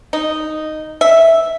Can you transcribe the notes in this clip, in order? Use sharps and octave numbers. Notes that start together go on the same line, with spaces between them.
D#4
E5